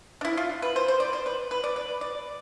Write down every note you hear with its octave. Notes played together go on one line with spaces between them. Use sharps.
D4
E4
F4
B4
C5
C5
D5
C5
B4
B4
D5
B4
D5